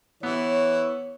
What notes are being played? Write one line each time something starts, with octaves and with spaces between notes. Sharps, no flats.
E3 B3 C#5